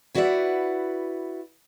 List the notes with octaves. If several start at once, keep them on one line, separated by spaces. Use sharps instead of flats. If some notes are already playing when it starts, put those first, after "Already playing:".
E4 F#4 B4 D5 E5 F#5